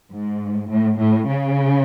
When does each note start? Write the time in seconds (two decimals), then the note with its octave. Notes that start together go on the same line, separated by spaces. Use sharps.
0.12 G#2
0.69 A2
0.98 A2
1.27 C#3